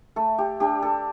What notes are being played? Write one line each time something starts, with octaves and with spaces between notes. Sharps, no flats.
A3 A4
G4
D4 G4
A4